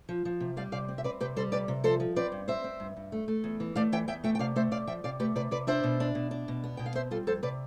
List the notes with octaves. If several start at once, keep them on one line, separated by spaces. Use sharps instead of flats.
F3
F3
C3
G3 D5 F5
C3 D5 F5
C4
E5
C4 B4 D5
C3 G4 B4
G3 A4 C5
C3 B4 D5
C3
F3 A4 C5
F3
C4 B4 D5
G2
C4 C5 E5
C4
G2
G2
A3
A3
E2
E3
A3 D5 F5
E3 E5 G5
E2 E5 G5
A3 E5 G5
G5
C3 D5 F5
A3 C5 E5
C3 D5 F5
F3 E5 G5
C3 D5 F5
A3 G4 B4
C3 B4 D5
C3 B4 D5
D4 C5 E5
B2
D4
B2
D4
B2
B3
B2 G5
F5
C4 C5 E5
G3 F4 A4
F2 A4 C5
C3 B4 D5